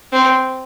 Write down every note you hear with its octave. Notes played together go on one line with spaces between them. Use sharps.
C4